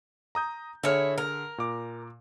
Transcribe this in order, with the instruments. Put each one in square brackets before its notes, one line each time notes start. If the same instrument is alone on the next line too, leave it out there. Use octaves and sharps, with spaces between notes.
[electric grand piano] A#5 D#6 G6
[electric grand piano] D3 G#4 F6 [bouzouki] E4 C#5
[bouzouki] A#4
[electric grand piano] A#2 D6